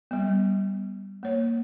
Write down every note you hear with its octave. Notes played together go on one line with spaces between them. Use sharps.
G3 B3
A#3 C#5